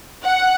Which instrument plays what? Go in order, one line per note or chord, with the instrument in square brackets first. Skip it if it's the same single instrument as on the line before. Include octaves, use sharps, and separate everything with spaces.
[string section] F#5